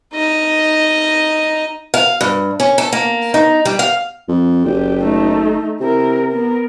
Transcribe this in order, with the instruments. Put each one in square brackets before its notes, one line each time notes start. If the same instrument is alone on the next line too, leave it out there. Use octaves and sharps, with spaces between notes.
[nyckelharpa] D#4 D#5
[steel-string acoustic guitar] F5
G2
C#4
A4
A#3
D#4
G3
F5
[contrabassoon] F2
[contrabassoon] F#1 [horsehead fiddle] G4
[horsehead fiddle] A3 D#4
[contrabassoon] C3 [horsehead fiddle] E4 A#4
[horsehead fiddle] B3 A#4